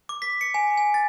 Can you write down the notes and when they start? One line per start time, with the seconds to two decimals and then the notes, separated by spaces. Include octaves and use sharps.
0.09 D6
0.22 B6
0.41 C#7
0.54 G#5
0.77 G#5
0.94 A6